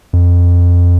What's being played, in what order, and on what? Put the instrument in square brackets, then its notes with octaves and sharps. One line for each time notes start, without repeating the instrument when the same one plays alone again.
[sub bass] F2